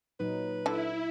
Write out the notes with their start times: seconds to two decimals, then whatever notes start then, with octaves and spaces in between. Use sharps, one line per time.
0.20 A#2 F#3 D#4 B4
0.66 D3 E4 A4